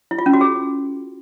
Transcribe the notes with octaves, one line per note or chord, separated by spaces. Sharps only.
E4
F4
C#4
F#4
G#4